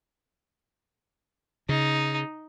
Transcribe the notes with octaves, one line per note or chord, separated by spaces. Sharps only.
C#3 D#4